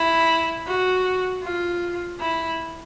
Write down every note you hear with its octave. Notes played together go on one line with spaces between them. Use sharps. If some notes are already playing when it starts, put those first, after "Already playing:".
Already playing: E4
F#4
F4
E4